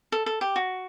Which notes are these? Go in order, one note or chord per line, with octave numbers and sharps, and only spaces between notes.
A4
A4
G4
F#4